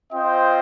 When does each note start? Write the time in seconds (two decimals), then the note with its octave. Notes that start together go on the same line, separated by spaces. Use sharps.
0.12 C4 F4 C5 D#5 G5